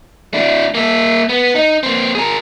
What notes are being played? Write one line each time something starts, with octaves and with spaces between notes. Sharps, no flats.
D4 E4
A#3 E5
B3
D#4
A#3 C4
G#4 A#4